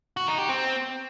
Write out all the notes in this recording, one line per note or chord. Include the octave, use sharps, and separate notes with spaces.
F#4
D#4
G4
C4